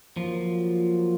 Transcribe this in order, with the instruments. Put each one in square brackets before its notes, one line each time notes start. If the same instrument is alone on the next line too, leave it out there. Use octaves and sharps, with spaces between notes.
[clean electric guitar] F3 [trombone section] F#3 A#3 F4